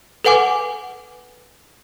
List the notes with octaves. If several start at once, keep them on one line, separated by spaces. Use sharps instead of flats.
A4 B4 F#5 G#5 D6